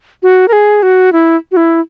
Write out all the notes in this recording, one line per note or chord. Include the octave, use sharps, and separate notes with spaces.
F#4
A#4
G#4
F#4
E4
F#4
E4